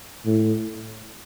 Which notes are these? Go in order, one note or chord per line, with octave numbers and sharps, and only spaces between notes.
A2